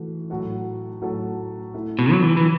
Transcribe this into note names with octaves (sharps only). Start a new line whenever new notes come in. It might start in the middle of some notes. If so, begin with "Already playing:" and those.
Already playing: E3 A3 F#4
A2 F#3 A3 F#4 A4
A2 F#3 A3 F#4 A4
A3 E4 A4
B2
F#3
E3
E3